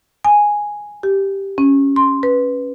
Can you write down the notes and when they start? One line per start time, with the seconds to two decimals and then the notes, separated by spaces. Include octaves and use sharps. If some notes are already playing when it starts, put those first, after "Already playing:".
0.25 G#5
1.03 G4
1.58 C#4
1.96 C6
2.23 B4